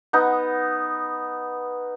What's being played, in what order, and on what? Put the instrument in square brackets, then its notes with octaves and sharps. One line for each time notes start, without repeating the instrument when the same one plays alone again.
[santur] B3 D#4